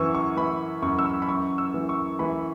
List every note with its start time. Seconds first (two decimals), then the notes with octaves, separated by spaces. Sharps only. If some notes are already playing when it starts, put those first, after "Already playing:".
Already playing: F#2 E3 C#6 E6
0.15 C#6
0.36 E3 B5
0.82 F#2 C#6
0.99 E6
1.05 C#6
1.22 B5
1.29 F#2 C#6
1.58 E6
1.74 E3
1.89 C#6
2.19 E3 B5